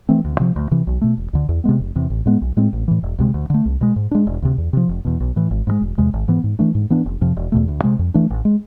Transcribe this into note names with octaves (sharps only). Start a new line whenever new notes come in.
E3 A3 C4
D2
C3 F3
D2
C3 E3
B1
B2 A3
E1
D2 D3
E2
C3 G#3 B3
F1
E2 C3
A1
A2 G#3 B3
B1
A2 G#3 C4
A1
A2 E3
E1
D2 C3 G#3
D2
D3 A3
C2
B2 G#3
G#2
G#3 D4
E1
D2 C3
E2
C3 F3
F1
E2 B2
B1
A2 E3
G#1
G#2 F3 G#3
E1
E2 C3 G#3
G#1
G#2 E3 B3
G#2
E3 A3 D4
G#2
E3 B3 D4
F1
F2 C3 F3
E1
E2 B2 A3
D2
C3 G#3
F2
E3 A3 D4
A1
G#3